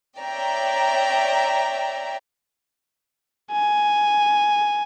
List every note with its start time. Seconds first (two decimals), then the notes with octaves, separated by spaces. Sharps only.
0.18 C#5 D5 E5 G5 A#5
3.52 G#5